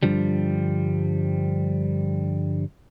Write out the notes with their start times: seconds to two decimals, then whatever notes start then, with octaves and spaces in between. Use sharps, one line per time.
0.03 G2 D3 F3 G3